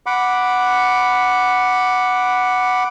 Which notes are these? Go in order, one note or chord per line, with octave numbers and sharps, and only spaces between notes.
F#5 B5 D6